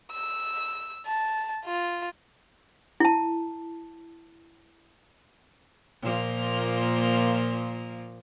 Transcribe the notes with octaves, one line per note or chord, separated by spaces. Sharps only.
E6
A5
F4
E4 A5
A#2 F3 A#3